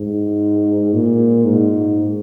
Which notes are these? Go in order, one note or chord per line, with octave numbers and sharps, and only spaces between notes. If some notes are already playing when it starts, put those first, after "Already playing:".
Already playing: G#2
A#2
G#2